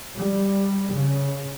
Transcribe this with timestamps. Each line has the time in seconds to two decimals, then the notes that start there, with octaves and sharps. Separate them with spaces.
0.15 G3
0.92 C#3